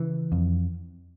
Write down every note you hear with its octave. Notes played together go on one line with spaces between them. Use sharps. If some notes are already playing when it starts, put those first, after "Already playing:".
Already playing: C#3 E3
F2